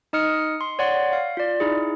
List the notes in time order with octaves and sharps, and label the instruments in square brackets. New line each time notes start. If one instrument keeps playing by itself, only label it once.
[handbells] D#4 D#5 D#6 F6 C#7
C6
C#5 D5 F#5 C6
F5
F4 D5
D#4 E4 G#4